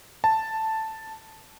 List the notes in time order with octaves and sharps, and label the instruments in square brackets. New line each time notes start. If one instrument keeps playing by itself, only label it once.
[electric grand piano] A5